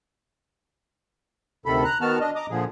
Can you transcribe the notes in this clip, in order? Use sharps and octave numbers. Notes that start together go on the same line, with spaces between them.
D2 C3 D#3 A4 B5
A#5 F#6
D#3 B3 F#4 A5 F6
D4 D#5
D#5 A#5 D6 D#6
A#2 D3 F3 G#4